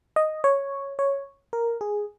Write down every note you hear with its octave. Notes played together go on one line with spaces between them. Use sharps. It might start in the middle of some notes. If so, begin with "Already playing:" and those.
D#5
C#5
C#5
A#4
G#4